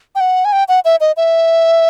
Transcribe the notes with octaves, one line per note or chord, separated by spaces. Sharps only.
G5
F#5
G#5
G5
F#5
E5
D#5
E5